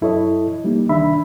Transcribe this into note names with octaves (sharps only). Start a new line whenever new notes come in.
F#2 E4 A4 C#5 D#5
G3 A#3 D#4
C2 D#3 D4 E5 B5